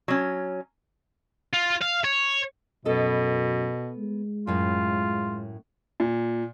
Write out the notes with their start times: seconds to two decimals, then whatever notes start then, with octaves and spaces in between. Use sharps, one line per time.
0.08 F#3 C#4
1.54 F4
1.82 F5
2.04 C#5
2.85 F#2 B2 B3 A4 D#5
3.98 G#3
4.47 F#2 A2 F4
6.00 A#2